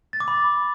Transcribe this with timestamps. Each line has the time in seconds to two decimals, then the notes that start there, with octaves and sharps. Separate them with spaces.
0.13 A6
0.20 D6
0.28 B5